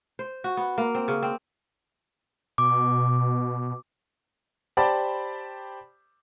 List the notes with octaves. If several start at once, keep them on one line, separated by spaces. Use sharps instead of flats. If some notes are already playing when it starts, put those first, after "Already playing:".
C5
F#4
B3
A#3
C4
C#3
C4
B2 D6
G4 C5 D5 A5 B5